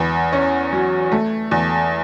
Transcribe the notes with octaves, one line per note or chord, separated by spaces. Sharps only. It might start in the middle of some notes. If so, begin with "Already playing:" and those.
Already playing: E2 B3
C#4
F#3
A3
E2